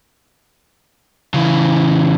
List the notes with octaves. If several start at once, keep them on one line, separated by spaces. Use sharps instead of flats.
C#3 E3